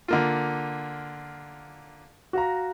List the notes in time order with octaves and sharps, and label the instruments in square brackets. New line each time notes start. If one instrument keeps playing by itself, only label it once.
[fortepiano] D3 A#3 F4
[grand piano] F#4 F5 A#5